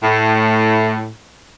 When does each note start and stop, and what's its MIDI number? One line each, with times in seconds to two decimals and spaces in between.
0.03 1.08 45